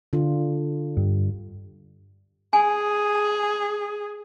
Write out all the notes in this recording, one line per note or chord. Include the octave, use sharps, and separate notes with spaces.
D3 D4 F4
G2
G#4 G#5